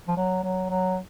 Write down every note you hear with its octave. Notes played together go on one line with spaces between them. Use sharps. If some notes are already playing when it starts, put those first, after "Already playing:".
F3
F#3
F#3
F#3